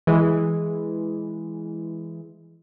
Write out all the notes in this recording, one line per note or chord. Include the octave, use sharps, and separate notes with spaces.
E3 G#3